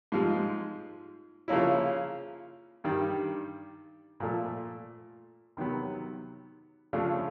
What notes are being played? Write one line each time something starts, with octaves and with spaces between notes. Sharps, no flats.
G#2 F3 G#3
C#3 F3 A#3 C#4 E4
G2 D#3 G3
A#2 F3 A3
C3 D#3 F#3 B3
C#3 F3 A3 D4